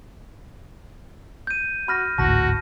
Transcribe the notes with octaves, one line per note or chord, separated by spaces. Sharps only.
G6 D#7
F#4 B5 F6 A#6
G#1 D2 A2 F#4 A5 A#6